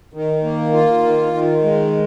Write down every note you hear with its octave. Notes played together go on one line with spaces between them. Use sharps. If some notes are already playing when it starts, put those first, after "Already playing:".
D#3
A#3
F4
D#3
D#3
G#3